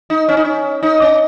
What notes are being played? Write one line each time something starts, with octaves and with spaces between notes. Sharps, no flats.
D#4
C#4
D#4
C#4
D#4
C#4